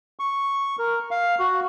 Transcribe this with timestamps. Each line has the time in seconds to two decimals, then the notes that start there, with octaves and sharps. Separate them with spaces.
0.19 C#6
0.79 A#4
1.11 F5
1.40 F#4